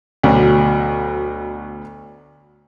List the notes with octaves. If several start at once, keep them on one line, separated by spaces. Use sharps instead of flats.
D2 B2 F#3